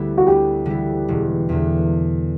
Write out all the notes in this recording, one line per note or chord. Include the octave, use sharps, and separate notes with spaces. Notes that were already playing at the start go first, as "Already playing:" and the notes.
Already playing: D2 D3 G3 B3 E4
F#4
D2 G4
D3 G3 B3 E4
E1
E2 D3